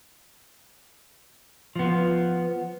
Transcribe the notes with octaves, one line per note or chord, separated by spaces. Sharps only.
F3 B3